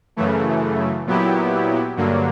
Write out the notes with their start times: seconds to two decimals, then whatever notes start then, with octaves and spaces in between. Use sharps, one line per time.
0.17 F#2 C#3 E3 A3
1.06 A#2 F#3 B3 E4 G4
1.97 G2 D3 F#3 A#3